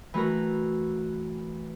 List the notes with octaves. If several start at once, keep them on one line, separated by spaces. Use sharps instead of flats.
E3 A3 F#4 A#4